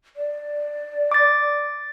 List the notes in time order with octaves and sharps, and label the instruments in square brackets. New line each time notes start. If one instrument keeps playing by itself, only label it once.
[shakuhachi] D5
[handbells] D6 A6